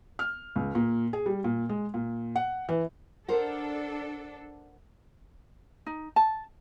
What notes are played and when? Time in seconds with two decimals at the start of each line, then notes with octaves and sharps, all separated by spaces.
0.19 F6
0.56 C#2
0.75 A#2
1.13 G#4
1.26 G3
1.44 A#2
1.69 G#3
1.94 A#2
2.36 F#5
2.69 E3
3.28 D4 A4 A#4 C5 F#5
5.86 D#4
6.16 A5